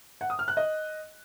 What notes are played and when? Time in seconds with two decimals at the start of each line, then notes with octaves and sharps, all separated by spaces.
0.21 F#5
0.30 D#6
0.39 F6
0.48 F#6
0.57 D#5